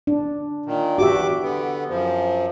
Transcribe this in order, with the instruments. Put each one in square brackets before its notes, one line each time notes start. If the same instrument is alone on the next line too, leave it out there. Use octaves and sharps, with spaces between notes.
[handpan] D4
[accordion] A#2 D#3
[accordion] E2 D6 [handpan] F#4 G4 E5
[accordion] D3 B3
F#2 F3